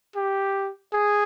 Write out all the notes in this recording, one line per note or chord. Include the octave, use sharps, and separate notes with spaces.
G4
G#4